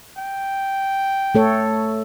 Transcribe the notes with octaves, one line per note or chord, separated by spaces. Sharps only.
G5
A3 A4 C#5